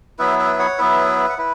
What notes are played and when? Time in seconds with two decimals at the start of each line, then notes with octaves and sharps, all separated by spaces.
0.19 F#3 B3 E4 B4 E5
0.39 B4 E5
0.53 E5
0.59 C#5 F#5
0.78 F#3 B3 E4 B4 E5
1.29 F#5
1.38 E4 B4